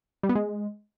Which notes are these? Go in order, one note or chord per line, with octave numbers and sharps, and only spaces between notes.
G3
B3
G#3